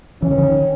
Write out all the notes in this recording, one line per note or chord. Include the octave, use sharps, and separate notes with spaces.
E3 C#4
D#3
D3
D#3